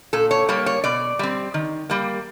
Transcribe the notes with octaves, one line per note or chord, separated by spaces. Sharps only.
A#2 A4
C#5
G3 A#3 C#5
C#5
B2 D5
G3 C4
D#3
G3 A#3